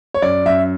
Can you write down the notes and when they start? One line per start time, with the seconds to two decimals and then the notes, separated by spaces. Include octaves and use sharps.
0.14 C#5
0.22 F#2 D5
0.45 F#2 E5